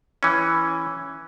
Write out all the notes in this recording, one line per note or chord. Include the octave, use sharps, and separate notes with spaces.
E3 C#4